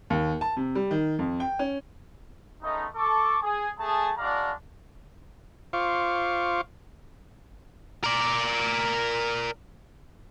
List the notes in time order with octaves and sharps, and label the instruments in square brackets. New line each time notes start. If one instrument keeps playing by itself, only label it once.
[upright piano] D#2
A5
C3
G3
D#3
F2
G5
C#4
[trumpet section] G#3 A3 B3 C#4 D#4
A4 C#6 D6
G#4
A3 G#4 A5
G#3 D4 F#4 D5 F5 A#5
[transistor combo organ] F4 C5 F5 C#6 D6
[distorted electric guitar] A#4 D5